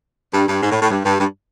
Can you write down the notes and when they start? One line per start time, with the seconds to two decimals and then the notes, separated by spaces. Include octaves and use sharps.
0.34 G2
0.48 G2
0.63 G#2
0.72 A2
0.82 A2
0.91 G2
1.05 G2
1.20 G2